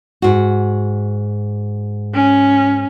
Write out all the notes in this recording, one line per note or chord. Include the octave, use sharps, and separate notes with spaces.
G#2 F#4
C#4